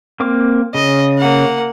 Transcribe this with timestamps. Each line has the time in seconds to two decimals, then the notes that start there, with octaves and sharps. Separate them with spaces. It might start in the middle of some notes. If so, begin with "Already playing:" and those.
0.20 A#3 C4 D6
0.75 C#3 D#5
1.18 A#3 F#5